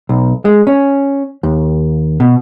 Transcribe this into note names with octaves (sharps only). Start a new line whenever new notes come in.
B1
G#3
C#4
D#2
B2